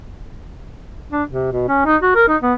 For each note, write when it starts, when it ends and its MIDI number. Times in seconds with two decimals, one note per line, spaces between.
1.12 1.23 62
1.30 1.51 48
1.52 1.64 47
1.69 1.84 61
1.86 1.97 63
2.02 2.13 66
2.15 2.27 70
2.28 2.37 63
2.42 2.53 59